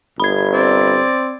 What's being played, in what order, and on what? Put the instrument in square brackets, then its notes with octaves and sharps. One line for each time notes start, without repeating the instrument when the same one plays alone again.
[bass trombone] G1 [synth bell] B5 G#6
[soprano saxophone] C4 [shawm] D5